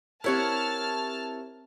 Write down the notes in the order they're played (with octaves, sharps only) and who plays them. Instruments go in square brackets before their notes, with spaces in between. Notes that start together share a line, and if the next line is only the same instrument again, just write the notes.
[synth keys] C4 G4 A#4 [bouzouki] E4 C#5 F#5 [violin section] A5 F6